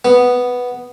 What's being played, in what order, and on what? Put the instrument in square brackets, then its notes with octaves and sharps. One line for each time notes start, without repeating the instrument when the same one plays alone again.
[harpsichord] B3